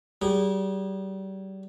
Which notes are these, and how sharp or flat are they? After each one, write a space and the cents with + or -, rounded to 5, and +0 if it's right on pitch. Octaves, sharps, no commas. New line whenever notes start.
G3 -35 G#4 -35